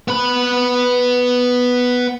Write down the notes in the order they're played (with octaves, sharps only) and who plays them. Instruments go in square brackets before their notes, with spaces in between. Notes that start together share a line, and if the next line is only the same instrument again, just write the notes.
[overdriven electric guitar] B3 B5